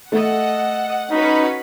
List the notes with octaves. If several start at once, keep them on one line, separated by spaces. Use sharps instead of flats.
A3 A4 D#5 F#5
C#4 D#4 F#4 B4 B5